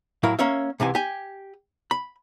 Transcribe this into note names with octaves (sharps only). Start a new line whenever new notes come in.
A2 F#3 E4 A#4 F5
A#3 C#4 C#5 E5
C2 C3 E3 G#5
G4 G#5
B5